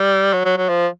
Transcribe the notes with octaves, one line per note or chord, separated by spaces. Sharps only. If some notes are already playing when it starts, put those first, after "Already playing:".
Already playing: G3
F#3
F#3
F#3
F3